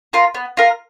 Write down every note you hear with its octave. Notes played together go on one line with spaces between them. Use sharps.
F4 A#4
B3
F4 A#4